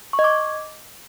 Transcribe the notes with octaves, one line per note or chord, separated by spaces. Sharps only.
C#6
D#5
D6